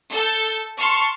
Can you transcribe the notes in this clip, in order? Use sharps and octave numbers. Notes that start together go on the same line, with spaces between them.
A4 G6
A5 C6 C#6 F6